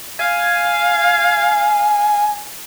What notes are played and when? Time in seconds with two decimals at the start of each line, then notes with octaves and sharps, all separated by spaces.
0.19 F5 G#5